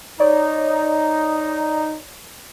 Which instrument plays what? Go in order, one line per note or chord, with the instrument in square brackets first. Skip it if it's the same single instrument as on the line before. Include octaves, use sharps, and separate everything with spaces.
[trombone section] D#4 [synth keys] C#5 D5